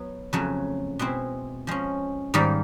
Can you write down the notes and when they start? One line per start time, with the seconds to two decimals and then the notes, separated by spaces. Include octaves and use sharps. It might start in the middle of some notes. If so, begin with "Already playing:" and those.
Already playing: F#3 B3
0.33 F2 C#3 F#3 A3
0.99 B2 G#3 C4 E4
1.67 F3 G#3 C#4
2.34 G#2 D#3 G3 A#3